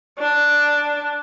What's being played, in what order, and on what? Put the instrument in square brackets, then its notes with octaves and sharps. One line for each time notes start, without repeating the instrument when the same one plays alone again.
[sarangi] D4